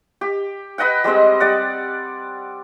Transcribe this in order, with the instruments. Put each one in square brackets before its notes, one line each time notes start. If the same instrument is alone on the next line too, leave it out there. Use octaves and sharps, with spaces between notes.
[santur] G4
B4 D#5 F#5 G5
G3 G#3 C4 D#5
G3 D5 F#5